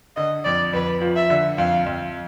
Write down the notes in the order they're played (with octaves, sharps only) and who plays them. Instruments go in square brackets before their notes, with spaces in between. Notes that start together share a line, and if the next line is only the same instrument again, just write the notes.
[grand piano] D3 [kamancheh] D#5
[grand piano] F2 [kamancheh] D5
[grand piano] F2 [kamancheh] B4
[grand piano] F3
[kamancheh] E5
[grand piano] D3
[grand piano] F2 [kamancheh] F5
[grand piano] F2